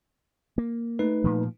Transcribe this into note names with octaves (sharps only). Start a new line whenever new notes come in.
A#3
A3 D#4 B4
A#2 F3